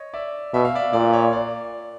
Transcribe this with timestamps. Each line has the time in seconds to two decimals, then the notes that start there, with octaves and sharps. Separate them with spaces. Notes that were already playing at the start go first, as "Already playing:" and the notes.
Already playing: C#5 D#5
0.13 D5 E5
0.54 B2 E5
0.65 F5
0.75 D5 E5
0.93 A#2 D5
1.13 C#5
1.33 D5